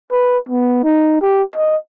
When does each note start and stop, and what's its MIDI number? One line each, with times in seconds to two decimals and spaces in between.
0.11 0.38 71
0.49 0.82 59
0.84 1.17 63
1.22 1.43 67
1.56 1.77 75